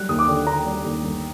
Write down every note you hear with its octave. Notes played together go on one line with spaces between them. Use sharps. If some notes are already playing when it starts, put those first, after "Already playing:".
Already playing: F#3 G3 F#6
D#2 D#6
D6
D3
D3 A#5
G3
D#2
G1